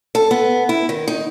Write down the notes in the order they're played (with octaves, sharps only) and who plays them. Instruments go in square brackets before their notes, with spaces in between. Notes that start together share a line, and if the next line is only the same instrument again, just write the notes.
[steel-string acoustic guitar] A4
B3
E4
D#3
D#4